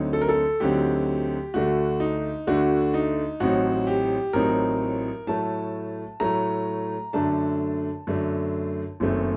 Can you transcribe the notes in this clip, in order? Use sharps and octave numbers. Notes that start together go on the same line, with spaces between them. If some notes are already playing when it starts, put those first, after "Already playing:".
Already playing: D2 D3 F#3 C4 D#4
A4
A#4
A4
D2 D3 F#3 C4 D#4 G4
D2 D3 A3 D4 F#4
D#4
D2 D3 A3 D4 F#4
D#4
A1 A2 F#3 C4 D#4 F#4
G4
A1 A2 F#3 C4 D#4 A#4
A2 F#3 A3 A5
A2 F#3 A3 A#5
F#2 D3 A3 D4 A5
F#2 D3 A3 D4
F#1 F#2 D#3 A3 C4